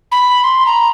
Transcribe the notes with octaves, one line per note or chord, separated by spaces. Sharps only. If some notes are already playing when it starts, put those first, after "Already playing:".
B5
C6
A#5